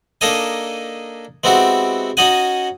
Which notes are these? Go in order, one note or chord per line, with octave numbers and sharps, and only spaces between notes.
A#3 D4 D#4 A4 D#5 G#5
G#3 B3 C4 E4 F#4 G4
C#4 D#4 F#4 D#5 F#5 G#5